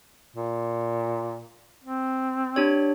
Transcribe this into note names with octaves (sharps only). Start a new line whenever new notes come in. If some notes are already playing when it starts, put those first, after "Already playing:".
A#2
C4
D4 G4 C#5